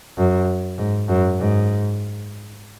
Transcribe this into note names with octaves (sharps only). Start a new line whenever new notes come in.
F#2
G#2
F#2
G#2